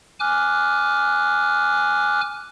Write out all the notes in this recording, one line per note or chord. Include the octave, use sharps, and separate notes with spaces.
G#5 D6 F6 F#6